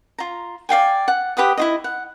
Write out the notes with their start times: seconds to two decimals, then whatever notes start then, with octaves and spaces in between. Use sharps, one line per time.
0.18 F4 A#5
0.69 D5 F5 G5 G#5
1.08 F#5
1.37 G4 B4 F#5 D#6
1.57 E4 F4 D#5
1.84 F#5